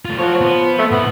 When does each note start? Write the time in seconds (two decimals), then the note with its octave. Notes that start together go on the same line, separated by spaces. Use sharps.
0.05 A3 F4
0.18 F3 C#5 F#5
0.41 B3
0.78 A3
0.92 A2 B3 F#5